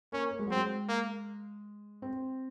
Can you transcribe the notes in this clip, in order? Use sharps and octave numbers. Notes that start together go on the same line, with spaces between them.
A#3 C#4
A#3
G#3
F#3
G#3 C4
A#3
C4